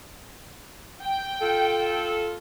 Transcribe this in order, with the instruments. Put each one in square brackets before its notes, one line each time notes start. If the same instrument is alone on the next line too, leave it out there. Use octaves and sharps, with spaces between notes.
[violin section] G5
[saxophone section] F4 A4